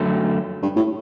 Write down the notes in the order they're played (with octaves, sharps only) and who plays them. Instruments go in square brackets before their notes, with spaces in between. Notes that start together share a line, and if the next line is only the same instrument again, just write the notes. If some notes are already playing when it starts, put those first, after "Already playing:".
Already playing: [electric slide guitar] F#2 D3 F#3 A3
[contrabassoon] G2
A2